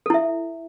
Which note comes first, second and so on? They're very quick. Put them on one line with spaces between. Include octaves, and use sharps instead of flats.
A4 E4 E5